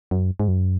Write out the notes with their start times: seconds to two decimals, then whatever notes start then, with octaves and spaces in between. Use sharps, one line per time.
0.11 F#2
0.40 G#2
0.48 F#2